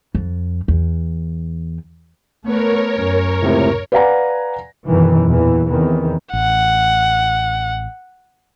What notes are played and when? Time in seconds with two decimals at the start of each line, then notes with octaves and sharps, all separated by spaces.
0.15 F2
0.68 E2
2.45 A3 B3 A#4 C#5
2.96 F#2
3.42 C#2 A2 C3
3.92 B4 D5 F5 F#5 G#5 A#5
4.87 F#2 B2 D#3 E3
5.26 E2 A#2 E3
5.70 E2 C3 D#3 E3
6.33 A1 F#5